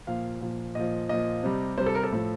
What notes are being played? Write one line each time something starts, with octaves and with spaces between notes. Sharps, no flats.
A#2 F3 F5
A#2 F3
A#2 F3 D#5
A#2 F3 D#5
C3 G3
C3 G3 C5
A4
A#4
A4
A2 F3